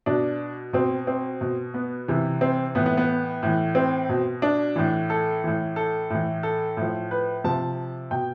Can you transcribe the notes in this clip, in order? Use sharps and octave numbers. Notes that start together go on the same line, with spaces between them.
B2 D4
B2 C4
C4
B2
B3
C3 E3
C4
A2 E3 B3
B3
B3
A2 E3
C4
B2
D4
A2 E3
A4
A2 E3
A4
A2 E3
A4
A2 F3
B4
C3 F3 A5
B2 G5